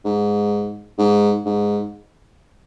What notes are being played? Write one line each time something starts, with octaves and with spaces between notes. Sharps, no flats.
G#2
G#2
G#2